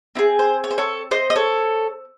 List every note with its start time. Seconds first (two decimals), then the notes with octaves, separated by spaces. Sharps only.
0.15 C4 E4 G#4
0.39 C5
0.64 C#5
0.71 C5
0.78 A4 C#5
1.11 C5 D#5
1.30 D#5
1.36 A4 C#5